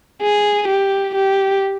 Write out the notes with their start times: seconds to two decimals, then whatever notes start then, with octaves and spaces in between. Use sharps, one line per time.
0.22 G#4
0.68 G4
1.15 G4